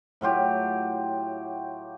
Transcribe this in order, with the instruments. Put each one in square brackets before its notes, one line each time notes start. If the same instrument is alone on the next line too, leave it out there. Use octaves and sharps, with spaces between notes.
[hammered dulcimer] A2 F#3 F4 G4